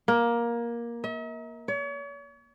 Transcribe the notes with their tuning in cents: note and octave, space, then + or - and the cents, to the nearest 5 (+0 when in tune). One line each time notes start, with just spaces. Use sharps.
A#3 +15
E5 -45
C#5 +40